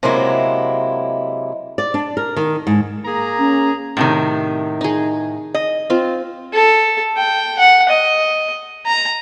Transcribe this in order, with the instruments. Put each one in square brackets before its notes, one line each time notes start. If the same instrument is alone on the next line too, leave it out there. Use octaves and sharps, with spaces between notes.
[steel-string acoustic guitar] C3 F#3 G#3 A#3 E4
[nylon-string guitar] D5
D4
A#4
D#3
G#2
[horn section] A#3 G#4 A#5
[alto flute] C#4
[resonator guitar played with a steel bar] A2 C3 D#3
[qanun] D#4 G#4
[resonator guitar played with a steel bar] D#5
[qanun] C4 F4
[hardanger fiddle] A4
G5
F#5
D#5
A#5